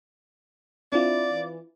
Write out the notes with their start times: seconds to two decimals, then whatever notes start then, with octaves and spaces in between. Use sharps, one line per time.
0.92 C4 D4 E4 F4 D5
1.32 E3